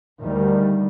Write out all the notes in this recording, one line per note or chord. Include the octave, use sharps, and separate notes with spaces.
D2 D#3 G3